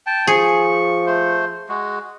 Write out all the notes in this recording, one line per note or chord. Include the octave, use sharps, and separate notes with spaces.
G5 A5
F3 G#4 C#6
A3 C5
G#3 F#4